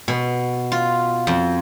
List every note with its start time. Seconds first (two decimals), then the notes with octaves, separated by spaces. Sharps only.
0.08 B2
0.72 F4
1.27 F2